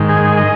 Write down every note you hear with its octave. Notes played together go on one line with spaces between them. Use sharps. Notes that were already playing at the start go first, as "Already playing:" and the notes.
Already playing: G#2 D#3
G#4
D#5